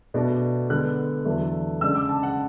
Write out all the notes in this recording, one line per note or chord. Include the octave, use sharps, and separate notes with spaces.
B2 A3 D4
D3 G#3 B3 F#6
E2 D3 F#3 A3 D4
C#3 G#3 D4 E6
D6
A5
F#5